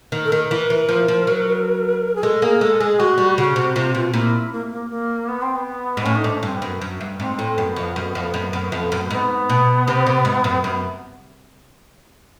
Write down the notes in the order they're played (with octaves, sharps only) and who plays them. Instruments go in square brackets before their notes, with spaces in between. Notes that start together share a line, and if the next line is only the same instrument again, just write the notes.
[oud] D#3
[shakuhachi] A4
[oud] D#3 [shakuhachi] A#4
[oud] E3
E3
F3
F3
F#3
[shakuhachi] G#4
[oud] G#3 [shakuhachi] A4
[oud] A#3 [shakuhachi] G#4
[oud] G#3 [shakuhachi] A4
[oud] G#3 [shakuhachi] G#4
[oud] G#3 [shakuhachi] F#4
[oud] G3
[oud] C#3 [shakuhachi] F#4
[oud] C3
[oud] C3 [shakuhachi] F4
[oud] B2
[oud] A#2 [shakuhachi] E4
[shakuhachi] A#3
A#3
A#3
B3
C4
B3
[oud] G#2
[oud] A2 [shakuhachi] C#4
[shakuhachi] D#4
[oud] G#2 [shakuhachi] D4
[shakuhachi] C#4
[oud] G2 [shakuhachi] C4
[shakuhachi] B3
[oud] F#2
F#2
G2
[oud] G#2 [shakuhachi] C4
[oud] A2
[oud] F#2 [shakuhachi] B3
[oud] F2
F#2
F2
F#2
F#2
F2
F#2
[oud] G#2 [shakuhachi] B3
[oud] B2
C3
C3
G#2
F#2
[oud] F#2 [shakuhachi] B3